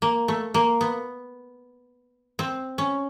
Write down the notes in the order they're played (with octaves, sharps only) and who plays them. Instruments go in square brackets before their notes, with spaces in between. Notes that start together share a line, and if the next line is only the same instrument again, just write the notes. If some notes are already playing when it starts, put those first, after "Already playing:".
[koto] A#3
A3
A#3
B3
C4
C#4